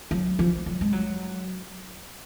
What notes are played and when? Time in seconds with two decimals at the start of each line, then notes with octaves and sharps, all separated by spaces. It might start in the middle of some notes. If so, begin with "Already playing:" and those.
0.11 F#3
0.39 F3
0.66 F#3
0.81 G#3
0.93 F#3